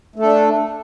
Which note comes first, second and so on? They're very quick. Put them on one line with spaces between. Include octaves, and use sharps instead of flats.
A3 A4 D4